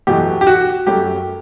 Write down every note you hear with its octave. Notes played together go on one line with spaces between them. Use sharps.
E2 B2 F#3 A3 G4
G4
F#4
F#2 F#3 A3 G4